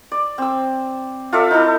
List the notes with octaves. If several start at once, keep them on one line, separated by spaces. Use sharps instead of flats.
D5
C4 E6
F4 A4 D5 E5
D#4 E4 A4